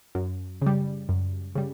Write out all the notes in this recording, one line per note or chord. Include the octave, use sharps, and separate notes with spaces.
F#2
C#3 G3
F#2
C#3 G3